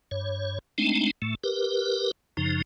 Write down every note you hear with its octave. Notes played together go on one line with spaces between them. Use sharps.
G2 C#5
G#3 A3 C4 D4 D#4
A2 A3
G4 A#4 B4
F#2 C#3 F3 D#4